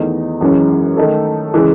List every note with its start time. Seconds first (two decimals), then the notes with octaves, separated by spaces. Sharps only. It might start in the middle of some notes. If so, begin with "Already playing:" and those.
Already playing: E2 D#3 A3 D#4
0.41 F#2 E3 G#3 C#4 G#4
0.97 D#3 A3 D#4 A4
1.54 C#3 E3 G#3